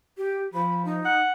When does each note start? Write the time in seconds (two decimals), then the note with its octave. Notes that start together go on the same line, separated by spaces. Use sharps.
0.18 G4
0.54 F3 B5
0.85 D#4
1.05 F#5